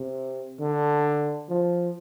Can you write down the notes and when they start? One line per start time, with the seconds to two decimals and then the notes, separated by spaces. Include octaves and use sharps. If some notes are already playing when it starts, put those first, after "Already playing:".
Already playing: C3
0.60 D3
1.49 F3